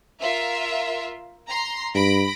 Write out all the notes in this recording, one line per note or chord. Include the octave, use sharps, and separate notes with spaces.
F4 A#4 E5
A#5 C6
G2 B5 A#6 D7